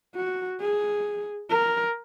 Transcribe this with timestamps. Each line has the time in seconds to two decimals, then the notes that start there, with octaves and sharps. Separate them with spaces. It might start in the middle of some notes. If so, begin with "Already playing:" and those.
0.15 F#4
0.60 G#4
1.50 A#4